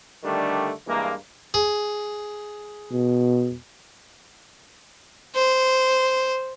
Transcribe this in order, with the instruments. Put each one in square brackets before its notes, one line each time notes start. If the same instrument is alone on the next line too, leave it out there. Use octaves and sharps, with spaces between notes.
[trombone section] D3 D#3 G3 A3 D4
G2 E3 G#3 A#3
[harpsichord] G#4
[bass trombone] B2
[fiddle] C5